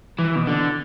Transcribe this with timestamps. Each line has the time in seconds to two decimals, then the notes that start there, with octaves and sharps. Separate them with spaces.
0.19 E3
0.36 B2
0.47 D3